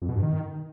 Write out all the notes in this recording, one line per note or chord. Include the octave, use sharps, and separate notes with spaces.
F2
B2
G2
D#3